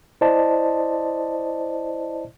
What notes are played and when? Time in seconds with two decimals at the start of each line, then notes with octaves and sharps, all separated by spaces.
0.21 E4 C5 D5 D#5 A5